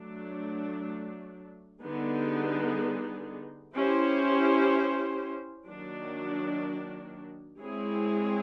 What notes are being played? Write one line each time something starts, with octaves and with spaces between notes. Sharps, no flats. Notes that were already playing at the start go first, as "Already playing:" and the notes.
Already playing: F#3 A3 D4
D3 G3 B3 D#4 G#4
C#4 E4 G4 C5
D#3 F#3 A#3 D4 F#4
G#3 C4 E4 G#4 C#5